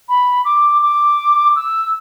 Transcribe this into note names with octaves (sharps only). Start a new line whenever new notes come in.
B5
D6
D6
E6